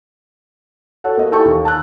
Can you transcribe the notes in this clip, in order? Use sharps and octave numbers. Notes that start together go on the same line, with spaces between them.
F#4 A4 C#5 F#5
A#3 D#5
E4 G4 A4 D#5 G5 C#6
D#2
A5 E6 F#6